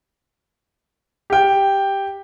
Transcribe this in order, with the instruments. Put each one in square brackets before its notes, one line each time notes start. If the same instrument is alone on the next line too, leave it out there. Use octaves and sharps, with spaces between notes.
[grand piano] G4 G5